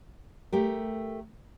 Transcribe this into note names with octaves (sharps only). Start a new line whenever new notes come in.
A3 G4 A#4